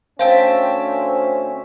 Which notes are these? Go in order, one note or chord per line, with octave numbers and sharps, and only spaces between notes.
D2 C4 C#4 C5 E5 F5 G5 A5